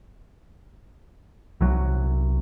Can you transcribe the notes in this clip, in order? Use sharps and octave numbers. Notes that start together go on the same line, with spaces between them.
C2 F#3